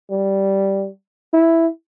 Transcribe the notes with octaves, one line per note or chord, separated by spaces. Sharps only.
G3
E4